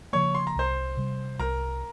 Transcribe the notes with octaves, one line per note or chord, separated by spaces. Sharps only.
C#3 F3 A#3 C#5 C#6
C6
A#5
C2 C5 C6
C3 G3
C2 A#4 A#5